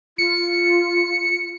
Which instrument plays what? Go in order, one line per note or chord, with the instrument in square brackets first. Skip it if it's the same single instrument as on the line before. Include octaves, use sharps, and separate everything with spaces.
[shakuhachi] F4 [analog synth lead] C#7